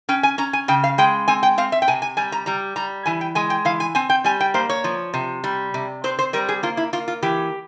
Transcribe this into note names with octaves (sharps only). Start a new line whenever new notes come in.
C#4 G5
G#5
C#4 A#5
G#5
C#3 G5
F5
G#3 G5
C4 G#5
G5
C4 F5
E5
G5
C3 G#5
G#5
G3 G#5
A#5
G3 A#5
G3 A#5
E3 G#5
G5
G#3 G#5
G5
E3 F5
G#5
C4 G#5
G5
G3 G#5
G5
A#3 C5
C#5
F3
C3
G3
C3
C4 C5
C5
G3 A#4
G#4
A#3 F4
E4
A#3 F4
F4
E3 G4